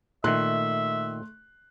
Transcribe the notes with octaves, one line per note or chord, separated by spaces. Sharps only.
A#2 D#3 A3 E5 C6 F#6